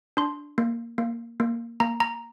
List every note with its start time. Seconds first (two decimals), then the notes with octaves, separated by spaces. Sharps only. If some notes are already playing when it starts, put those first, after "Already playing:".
0.17 D4 C6
0.58 A#3
0.98 A#3
1.40 A#3
1.80 A#3 A#5
2.00 A#5